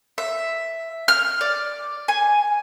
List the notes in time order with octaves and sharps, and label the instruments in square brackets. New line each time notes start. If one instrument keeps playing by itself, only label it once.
[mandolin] E5
F6
D5
G#5